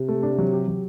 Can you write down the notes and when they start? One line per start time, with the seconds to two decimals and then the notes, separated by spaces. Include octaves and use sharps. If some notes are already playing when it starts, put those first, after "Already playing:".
Already playing: C3
0.08 A3
0.23 D4
0.38 F#3
0.53 G4
0.68 F#3